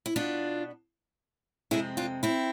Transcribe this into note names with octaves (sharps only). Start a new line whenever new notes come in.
E4
B2 B3 D4 F4
F2 C3 G#3 C4 E4 G#4
D4 F4
C4 E4